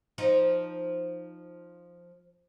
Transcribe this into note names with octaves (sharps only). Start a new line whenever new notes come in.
F3 D#4